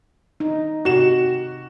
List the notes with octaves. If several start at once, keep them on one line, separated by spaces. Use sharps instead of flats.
D#4
C3 F#4 G4 E7